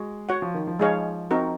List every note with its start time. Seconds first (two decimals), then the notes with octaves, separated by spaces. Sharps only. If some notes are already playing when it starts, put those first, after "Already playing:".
Already playing: G#3 F#4
0.29 F#4 C#5 F#5
0.42 F3
0.54 D#3
0.67 F3
0.79 G#3 D#4 G#4 C#5 F5
1.31 C4 D#4 F#4 A#4